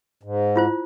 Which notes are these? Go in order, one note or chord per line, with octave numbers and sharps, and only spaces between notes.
G#2
E4 F4 C5